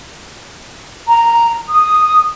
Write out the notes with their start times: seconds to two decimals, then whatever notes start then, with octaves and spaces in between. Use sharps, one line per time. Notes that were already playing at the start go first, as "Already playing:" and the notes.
1.08 A#5
1.69 D#6